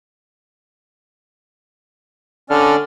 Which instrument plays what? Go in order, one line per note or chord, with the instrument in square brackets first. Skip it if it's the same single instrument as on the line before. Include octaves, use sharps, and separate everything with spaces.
[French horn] D3 [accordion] C#4 D5 F6